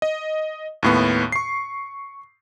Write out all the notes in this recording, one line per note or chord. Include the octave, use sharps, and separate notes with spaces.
D#5
D#2 A2 B3
C#6 C7